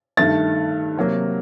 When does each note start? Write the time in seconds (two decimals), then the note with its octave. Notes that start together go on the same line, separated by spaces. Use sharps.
0.17 G2 D#3 A3 A6
0.97 C3 F#3 A#3